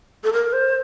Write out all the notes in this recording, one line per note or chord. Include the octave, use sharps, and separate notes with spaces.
A4
A#4
C5